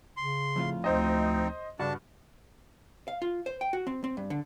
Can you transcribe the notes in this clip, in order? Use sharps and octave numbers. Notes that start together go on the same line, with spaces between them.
C#3 C6
F2 A2 F4
D2 C4 D#4 C5 D#5
G2 C#3 D4 F#4 A5
F5
F4
C5
G5
F#4
C4
C4
G2
D3